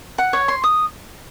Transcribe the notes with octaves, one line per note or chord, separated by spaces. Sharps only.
F#5
C#5
C6
D#6